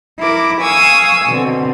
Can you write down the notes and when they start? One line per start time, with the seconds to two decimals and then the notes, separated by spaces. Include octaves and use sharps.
0.20 E4 A#4 D6
0.62 F5 G#5 C#6 D#6 E6
1.27 B2 D3 C4